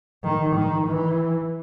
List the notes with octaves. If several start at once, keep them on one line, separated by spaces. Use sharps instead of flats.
D#3
D#3
E3